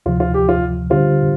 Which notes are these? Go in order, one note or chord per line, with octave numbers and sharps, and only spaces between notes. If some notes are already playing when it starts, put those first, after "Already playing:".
D2 C3 F3 F4
F4
G4
F4
D3 G3 D4 F4 G4 C5